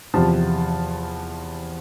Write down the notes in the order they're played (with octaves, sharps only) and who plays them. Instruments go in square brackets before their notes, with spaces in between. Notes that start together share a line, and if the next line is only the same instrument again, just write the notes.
[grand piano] E2 C3 F3 A5